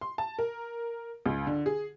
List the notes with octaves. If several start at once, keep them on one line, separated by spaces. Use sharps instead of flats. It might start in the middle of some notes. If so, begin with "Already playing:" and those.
C6
A5
A#4
C#2
D3
G#4